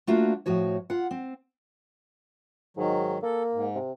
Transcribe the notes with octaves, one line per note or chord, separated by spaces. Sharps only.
A3 A#3 D4 F4 F#4
A2 F3 F#4 C#5
F4 F#5
C4
G#2 D#3 F#3
A#3 A4
G#2
C3